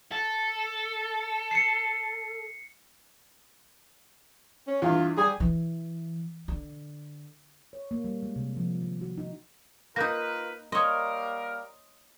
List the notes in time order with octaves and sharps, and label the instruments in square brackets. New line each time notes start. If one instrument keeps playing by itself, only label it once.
[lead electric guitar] A4
[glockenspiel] C7 C#7
[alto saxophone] C#4
[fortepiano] E2 G2 [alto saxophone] F4
[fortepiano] G3 G#5 [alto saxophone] G#4
[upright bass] E3
D3
[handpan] C#5
A#3
G3
G#3
C3
F3
D#3
F#4
D#4
[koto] A#3 D#4 [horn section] F4 A#4 B4 [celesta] G6 A#6
[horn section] G3 A#3 A#4 [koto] C#5 D#5 [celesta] C6 D#6